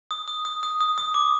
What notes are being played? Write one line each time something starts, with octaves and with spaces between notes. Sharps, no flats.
D#6
D#6
D#6
D#6
D#6
D#6
D6